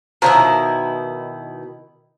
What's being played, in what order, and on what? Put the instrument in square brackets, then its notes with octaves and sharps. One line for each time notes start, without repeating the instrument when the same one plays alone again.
[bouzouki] B2 D#3 E4 [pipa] F3 F#3 A#4